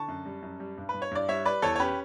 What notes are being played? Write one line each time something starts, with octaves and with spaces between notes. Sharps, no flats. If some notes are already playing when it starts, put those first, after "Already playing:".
Already playing: D3 A5 C#6
F#2
G3
F#2
G3
G2
B4
G2
C#5
G2 D5
G3 C#5 E5
G3 B4 D5
E2 A4 C#5
C#5
C#4 G4 B4